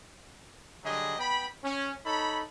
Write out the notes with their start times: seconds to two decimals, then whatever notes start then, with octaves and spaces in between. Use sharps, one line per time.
0.84 D3 F#3 G3 G#4 D#5
1.19 B3 G5 B5
1.64 C#4
2.06 D#4 A4 C#5 B5